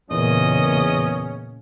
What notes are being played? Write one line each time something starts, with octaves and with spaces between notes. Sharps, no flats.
E2 A#2 C#3 C#4 D#5